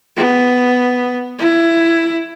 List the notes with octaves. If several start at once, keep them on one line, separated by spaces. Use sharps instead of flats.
B3
E4